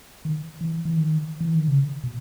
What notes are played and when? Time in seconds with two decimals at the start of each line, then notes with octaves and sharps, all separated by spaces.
0.25 D#3
0.61 E3
0.85 E3
0.97 D#3
1.41 E3
1.55 D#3
1.68 C#3
2.04 B2